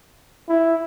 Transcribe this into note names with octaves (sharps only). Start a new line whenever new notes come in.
E4